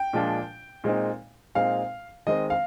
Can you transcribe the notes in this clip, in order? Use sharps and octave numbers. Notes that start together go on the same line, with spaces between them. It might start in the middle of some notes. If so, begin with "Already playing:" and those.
Already playing: G5
A#2 F3 G#3 D4 F4
A#2 G#3 C4 D#4
A#2 G#3 C4 D#4 F5
D#3 G#3 C4 D#5
F5